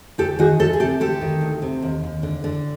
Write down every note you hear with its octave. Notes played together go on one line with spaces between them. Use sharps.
D2 G4 A4
D#3 F#4 G#4
D2 G4 A4
G#4
C3 G4 A4
D2 G4 A4
D#3
D2
C3
D#2
D#2
D3
D3